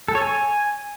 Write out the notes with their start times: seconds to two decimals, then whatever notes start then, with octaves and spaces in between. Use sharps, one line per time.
0.08 A4
0.15 C#5
0.22 G#5